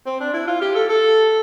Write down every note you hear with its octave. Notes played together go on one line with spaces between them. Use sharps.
C4
D4
E4
F4
G4
A4
A4